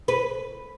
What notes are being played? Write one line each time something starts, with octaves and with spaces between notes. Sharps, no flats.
B4